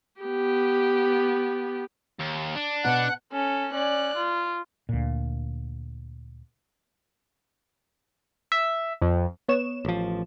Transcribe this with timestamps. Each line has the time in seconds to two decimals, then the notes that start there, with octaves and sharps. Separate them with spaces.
0.21 B3 G4
2.20 D#2
2.56 D4
2.85 B2 B3 F#5 A5 F#6
3.33 C#4 A4
3.74 C#4 D5 F#6
4.17 F4
4.89 D2 A#2
8.52 E5
9.02 F2
9.48 B3 C#5 E7
9.85 A1 F3